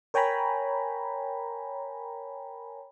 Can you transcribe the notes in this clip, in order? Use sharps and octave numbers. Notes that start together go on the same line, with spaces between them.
A#4 C#5 G5 G#5 A#5 B5